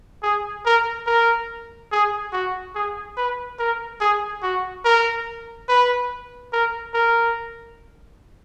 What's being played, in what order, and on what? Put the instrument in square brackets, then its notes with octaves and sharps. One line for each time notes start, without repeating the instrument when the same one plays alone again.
[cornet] G#4
A#4
A#4
G#4
F#4
G#4
B4
A#4
G#4
F#4
A#4
B4
A#4
A#4